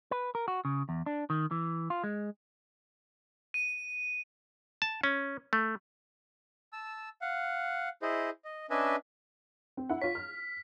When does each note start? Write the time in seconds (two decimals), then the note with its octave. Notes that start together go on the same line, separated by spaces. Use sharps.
0.11 B4
0.35 A#4
0.48 F#4
0.65 C#3
0.89 E2
1.06 D4
1.30 D#3
1.51 E3
1.90 F4
2.03 G#3
3.54 D#7
4.82 A5
5.04 C#4
5.53 A3
6.73 A5 E6
7.21 F5 F#5
8.02 E4 G#4 C5 D#5
8.45 D#5
8.70 C#4 D4 B4 D#5 E5 G#5
9.77 C4
9.89 E4 F#5
10.02 F4 C#5 B6
10.15 F6